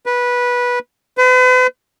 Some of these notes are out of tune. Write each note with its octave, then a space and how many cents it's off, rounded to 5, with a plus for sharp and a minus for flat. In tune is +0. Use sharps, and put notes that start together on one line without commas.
B4 -15
B4 +45